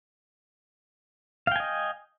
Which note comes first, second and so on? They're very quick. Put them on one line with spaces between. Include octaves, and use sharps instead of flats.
F5 G5 G#5 D#5